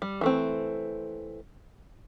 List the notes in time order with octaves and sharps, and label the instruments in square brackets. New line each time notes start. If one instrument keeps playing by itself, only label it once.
[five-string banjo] G3
E3 A3 C4